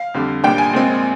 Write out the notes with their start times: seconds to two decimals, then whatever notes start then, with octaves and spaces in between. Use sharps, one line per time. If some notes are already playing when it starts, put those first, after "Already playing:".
Already playing: F5
0.14 F2 D3 G3
0.44 A#1 A#2 G3 D4 G5
0.58 G#5
0.73 A#1 A#2 G#3 C4